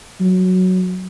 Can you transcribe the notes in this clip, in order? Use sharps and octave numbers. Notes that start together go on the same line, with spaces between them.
F#3